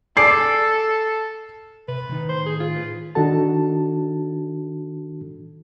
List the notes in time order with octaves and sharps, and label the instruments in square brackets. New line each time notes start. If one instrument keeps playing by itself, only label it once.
[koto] G#4 D5 [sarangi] A4 [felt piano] C7
[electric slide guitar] C3 [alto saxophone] B4
[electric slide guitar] A2 D#3 D#4
[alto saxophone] C5
G#4
F4
[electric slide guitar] G#4 B4
[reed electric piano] D#3 D4 D#4 F#4 A4 A5